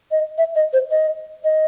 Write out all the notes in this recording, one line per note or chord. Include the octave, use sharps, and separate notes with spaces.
D#5
E5
D#5
C5
D#5
D#5